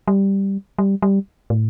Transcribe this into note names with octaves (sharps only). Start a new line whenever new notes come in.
G3
G3
G3
A2